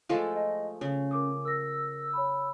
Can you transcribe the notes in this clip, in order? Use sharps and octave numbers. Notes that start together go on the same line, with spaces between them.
F3 G#3 A3 F5
D#5
C#3 C#4
A#4 D6 D#6
A#4 E6 A#6
C#5 B5